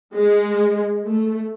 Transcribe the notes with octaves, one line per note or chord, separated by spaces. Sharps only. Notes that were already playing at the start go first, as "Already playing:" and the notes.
G#3
A3